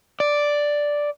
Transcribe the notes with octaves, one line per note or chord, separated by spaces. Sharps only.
D5